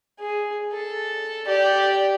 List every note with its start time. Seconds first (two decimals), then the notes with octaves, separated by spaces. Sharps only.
0.20 G#4
0.72 A4
1.45 G4 D5